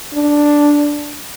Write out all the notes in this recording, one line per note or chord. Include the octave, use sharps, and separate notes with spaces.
D4